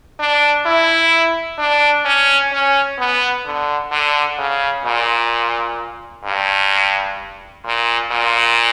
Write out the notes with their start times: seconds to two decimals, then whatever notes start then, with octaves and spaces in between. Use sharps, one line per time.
0.20 D4
0.66 E4
1.59 D4
2.05 C#4
2.53 C#4
2.99 B3
3.45 D3
3.92 D3
4.38 C#3
4.85 A#2
6.25 G2
7.65 A#2
8.11 A#2